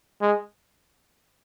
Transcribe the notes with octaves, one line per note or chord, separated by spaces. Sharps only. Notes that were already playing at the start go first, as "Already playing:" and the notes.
G#3